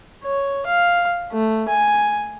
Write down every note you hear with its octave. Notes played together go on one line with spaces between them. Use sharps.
C#5
F5
A3
G#5